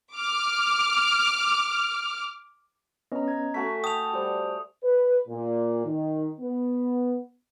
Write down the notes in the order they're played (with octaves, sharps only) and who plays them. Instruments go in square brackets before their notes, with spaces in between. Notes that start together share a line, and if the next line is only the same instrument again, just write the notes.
[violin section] D6 F6
[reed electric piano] B3 C#4 [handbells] D#5 A#5
[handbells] A#5 G#6
[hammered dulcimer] A3 F#4 G#5 [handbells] B6
[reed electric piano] G5 [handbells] A5 [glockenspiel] D#6 F7
[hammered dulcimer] G3 [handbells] G4 C5
[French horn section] B4
A#2
D#3
B3